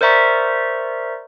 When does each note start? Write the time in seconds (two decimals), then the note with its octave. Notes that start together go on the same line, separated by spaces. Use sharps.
0.01 A#4 C5 D5 E5 A#5 C#6